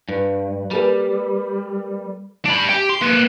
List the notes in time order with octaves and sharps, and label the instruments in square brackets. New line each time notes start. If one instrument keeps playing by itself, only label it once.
[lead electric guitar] G2 [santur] B4
[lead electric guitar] G3 [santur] A#3 A4 B4
[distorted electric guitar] D4 B5
G4 G5
C6
A#3 B4